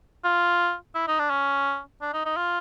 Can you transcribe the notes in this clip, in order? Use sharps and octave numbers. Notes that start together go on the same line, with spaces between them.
F4
E4
D#4
D4
C#4
D4
D#4
D#4
F4